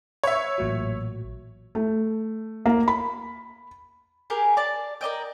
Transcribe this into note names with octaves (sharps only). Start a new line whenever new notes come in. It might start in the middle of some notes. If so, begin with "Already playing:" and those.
B4 C#5 E5
A1 A#2 F#3
A3
A#3
B5
G4 G#4 A#4
D5 A5
A#4 D5 D#5 G5